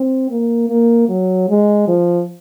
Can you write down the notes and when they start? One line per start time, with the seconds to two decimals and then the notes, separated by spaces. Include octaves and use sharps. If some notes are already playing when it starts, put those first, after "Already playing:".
Already playing: C4
0.30 A#3
0.69 A#3
1.09 F#3
1.49 G#3
1.88 F3